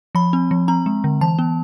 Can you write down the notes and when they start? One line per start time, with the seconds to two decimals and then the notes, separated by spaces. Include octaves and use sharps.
0.15 F3 B5
0.33 C4
0.51 F3
0.68 C4 A#5
0.86 G#3
1.04 D3
1.21 E3 A5
1.39 B3